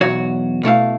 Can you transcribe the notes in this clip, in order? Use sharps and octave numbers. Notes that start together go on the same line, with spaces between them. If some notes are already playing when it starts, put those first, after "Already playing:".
B1 E2 F#4 C#5
B2 A3 E4 F5